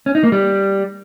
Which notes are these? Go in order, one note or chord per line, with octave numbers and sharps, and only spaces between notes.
C#4
D#4
A#3
G3